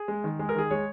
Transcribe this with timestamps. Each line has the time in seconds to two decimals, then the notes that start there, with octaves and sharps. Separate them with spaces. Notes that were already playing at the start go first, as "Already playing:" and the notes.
Already playing: G#4
0.08 G#3
0.24 D#3
0.39 G#3 G#4
0.49 A#4
0.55 D#3 G#4
0.70 G#3 C#5